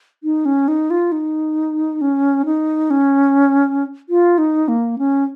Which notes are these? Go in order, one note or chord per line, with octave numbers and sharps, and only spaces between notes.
D#4
C#4
D#4
F4
D#4
C#4
D#4
C#4
F4
D#4
A#3
C#4